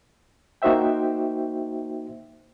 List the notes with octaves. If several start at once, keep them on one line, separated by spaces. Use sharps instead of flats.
A#3 D#4 F#4 C5 E5 G5